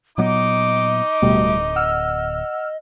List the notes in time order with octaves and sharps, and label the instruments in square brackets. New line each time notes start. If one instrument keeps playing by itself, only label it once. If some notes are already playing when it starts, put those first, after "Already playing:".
[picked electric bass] A#2 F#3 B3 [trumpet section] D#4 D6 [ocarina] D#5
[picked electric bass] D1 [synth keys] B2 G3 A3
[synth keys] F#5 E6 F6